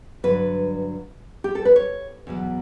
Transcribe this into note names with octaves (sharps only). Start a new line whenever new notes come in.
G2 D3 F#3 B4
G4
A4
B4
C#5
E2 B2 F#3